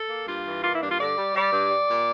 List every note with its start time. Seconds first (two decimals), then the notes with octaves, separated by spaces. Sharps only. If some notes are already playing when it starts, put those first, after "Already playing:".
Already playing: A4
0.09 A#3
0.27 G2 F4
0.45 E3
0.63 A#3 F4
0.72 E4
0.80 G2 D4
0.90 F4
0.99 D3 D5
1.17 G3
1.34 G3 D5
1.52 G2
1.70 G3
1.89 A#2